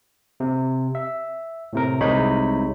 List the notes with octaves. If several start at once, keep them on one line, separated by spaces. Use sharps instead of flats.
C3
E5
A2 C3 A#4
C2 C3 G#3 D#4 C#5 B5